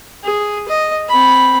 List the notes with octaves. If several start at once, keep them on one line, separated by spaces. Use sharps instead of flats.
G#4
D#5
C4 B5